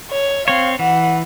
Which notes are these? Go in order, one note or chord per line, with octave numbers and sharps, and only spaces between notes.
C#5
C4 C#5 F5
E3 F#5